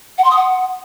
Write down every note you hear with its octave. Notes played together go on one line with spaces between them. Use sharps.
F#5
C6
D#6
F#5